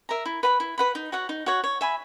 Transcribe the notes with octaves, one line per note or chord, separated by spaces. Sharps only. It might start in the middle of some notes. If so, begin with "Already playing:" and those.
A#4 E5 A#5
E4
B4 F#5 B5
E4
B4 F#5 B5
D#4
F#4 C#5 F#5
D#4
F#4 C#5 F#5
C#5
E5 G#5 B5